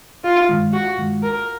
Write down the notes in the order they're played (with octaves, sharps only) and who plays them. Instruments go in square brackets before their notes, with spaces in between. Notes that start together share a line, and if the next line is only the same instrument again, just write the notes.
[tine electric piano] G1 [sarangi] F4
[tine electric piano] G2 D#3 G#3
[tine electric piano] G1 [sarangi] F#4
[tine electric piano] G2 D#3 G#3
[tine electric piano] G1 [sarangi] A#4